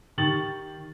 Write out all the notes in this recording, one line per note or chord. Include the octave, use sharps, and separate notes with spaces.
D#3 G4 C#6 A6 F#7